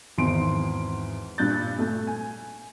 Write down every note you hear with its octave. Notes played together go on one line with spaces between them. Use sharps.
G#1 E2 D#3 C6 D7
G2 A#2 F#6 G6 A6
A3
G#5